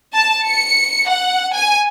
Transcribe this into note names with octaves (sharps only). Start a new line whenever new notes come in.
A5
C#7
F#5
G#5